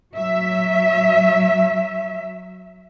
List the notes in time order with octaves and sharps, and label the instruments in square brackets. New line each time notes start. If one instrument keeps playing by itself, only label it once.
[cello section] F#3 E5